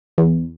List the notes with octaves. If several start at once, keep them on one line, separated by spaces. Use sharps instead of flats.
E2